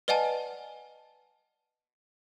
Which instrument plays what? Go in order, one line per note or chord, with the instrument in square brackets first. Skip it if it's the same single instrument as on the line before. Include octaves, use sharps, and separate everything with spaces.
[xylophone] B4 D5 D#5 F#5 G#5 A5